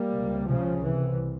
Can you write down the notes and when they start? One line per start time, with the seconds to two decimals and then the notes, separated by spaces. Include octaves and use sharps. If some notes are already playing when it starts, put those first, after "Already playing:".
Already playing: G3 A#3
0.11 C#2 C3
0.47 C#3 F3
0.83 C2 C3 E3